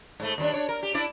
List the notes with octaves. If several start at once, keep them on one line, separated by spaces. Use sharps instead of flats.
G#2 A3
D#2 G3 D4
D4 C#5
A#4
G4
D4 E4 D5